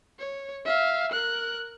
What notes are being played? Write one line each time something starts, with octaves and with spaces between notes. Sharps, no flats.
C#5
E5 F5
A#4 F#6